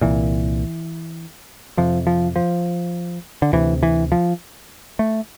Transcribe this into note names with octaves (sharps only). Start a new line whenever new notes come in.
C2 A#2 E3
F2 C3 F3
F3
F3
D3
D2 C3 E3
E3
F3
A3